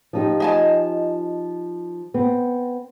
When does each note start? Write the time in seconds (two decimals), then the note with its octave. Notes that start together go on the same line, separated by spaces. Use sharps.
0.13 F3 D#4 G4
0.40 D#5 G#5 A5
2.14 B3 C4